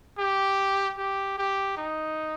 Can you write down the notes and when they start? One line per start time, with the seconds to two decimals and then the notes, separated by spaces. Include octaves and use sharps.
0.18 G4
0.98 G4
1.38 G4
1.77 D#4